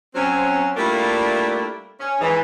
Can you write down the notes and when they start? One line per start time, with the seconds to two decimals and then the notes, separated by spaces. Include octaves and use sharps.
0.15 F#3 C4 C#4
0.77 G3 A3 A#3 D4 E4 F4
2.00 C#4
2.21 G#2 E3